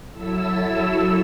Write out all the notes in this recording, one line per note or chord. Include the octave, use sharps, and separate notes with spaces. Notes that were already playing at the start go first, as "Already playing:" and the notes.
F#3 E4 A4 E6